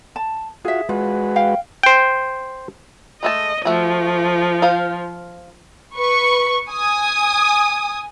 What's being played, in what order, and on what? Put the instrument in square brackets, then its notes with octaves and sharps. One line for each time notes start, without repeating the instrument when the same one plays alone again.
[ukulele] A5
[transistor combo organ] F4 F#4 [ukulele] G#4 E5
[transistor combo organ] G#3 F#4 B4 [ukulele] F4
[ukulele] F5 G5
[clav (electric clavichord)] C5 G5
[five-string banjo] G#3 A3 A5 [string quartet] D#5
[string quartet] F3 [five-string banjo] A3 F#4
[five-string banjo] F4 C5 F5
[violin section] B4 C#6
G#5 D#6